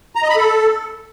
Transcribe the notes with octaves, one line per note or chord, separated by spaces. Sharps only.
A#5
D#5
B5
A4